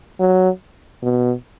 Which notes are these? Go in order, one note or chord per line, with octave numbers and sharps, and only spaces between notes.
F#3
B2